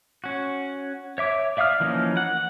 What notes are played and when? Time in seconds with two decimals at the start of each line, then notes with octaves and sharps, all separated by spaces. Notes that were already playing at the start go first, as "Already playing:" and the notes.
0.24 C#4 F#4
1.18 C#5 E5 D6
1.57 D5 E5 F5 D#6 F6
1.80 E3 F3 A#3 C#4 D#4
2.17 F#5